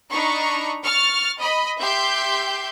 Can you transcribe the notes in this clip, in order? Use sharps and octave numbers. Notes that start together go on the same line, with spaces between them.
D4 D#4 A#5 B5 C#6
C#6 F6 A6
D#5 B5
G4 E5 G5 C6 G6